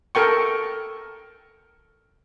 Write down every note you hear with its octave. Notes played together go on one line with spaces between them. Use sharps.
A4 A#4 G5 C#6